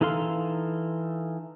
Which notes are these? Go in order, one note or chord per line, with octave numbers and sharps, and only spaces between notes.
E3 D#4 A4 F5 C6